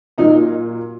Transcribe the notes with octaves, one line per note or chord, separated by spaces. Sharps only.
A#2 F#3 D#4